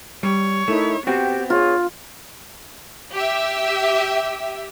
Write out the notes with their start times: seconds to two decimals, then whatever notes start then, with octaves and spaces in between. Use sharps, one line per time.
0.23 G3 C#5
0.68 A3 D#4 E4 A#4
1.07 B3 C4 F#4 G4 G6
1.50 F4 G#4 C#5 C#6
3.14 G4 E5